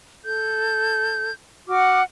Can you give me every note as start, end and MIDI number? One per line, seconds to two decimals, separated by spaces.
0.24 1.31 69
0.24 1.31 91
1.69 2.02 66
1.69 2.02 78
1.69 2.02 86
1.69 2.02 89